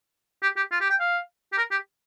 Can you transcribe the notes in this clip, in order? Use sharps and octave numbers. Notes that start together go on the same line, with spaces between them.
G4
G4
F4
G4
G5
F5
G4
A#4
G4